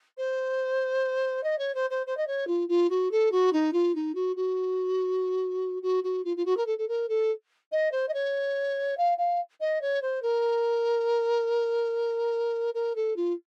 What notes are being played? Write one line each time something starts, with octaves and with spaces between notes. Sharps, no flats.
C5
D#5
C#5
C5
C5
C5
D#5
C#5
F4
F4
F#4
A4
F#4
D#4
F4
D#4
F#4
F#4
F#4
F#4
F4
F4
F#4
A#4
A4
A4
A#4
A4
D#5
C5
D#5
C#5
F5
F5
D#5
C#5
C5
A#4
A#4
A4
F4